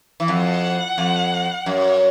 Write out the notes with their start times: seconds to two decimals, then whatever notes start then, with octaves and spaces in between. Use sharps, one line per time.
0.20 E3
0.28 F2 F#5
0.98 F2
1.66 F#2